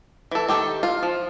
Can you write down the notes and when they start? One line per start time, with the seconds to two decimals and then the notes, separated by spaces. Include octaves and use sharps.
0.31 E3 A4
0.48 D#3 G4 A4
0.83 F4
1.03 F3